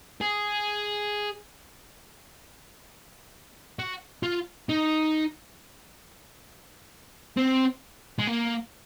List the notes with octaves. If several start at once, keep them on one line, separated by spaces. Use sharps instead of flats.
G#4
F#4
F4
D#4
C4
G#3
A#3